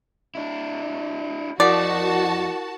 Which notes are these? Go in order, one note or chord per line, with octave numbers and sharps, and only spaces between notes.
D4 E4
F2 E4 F#4 A#4 D5 F#5 A5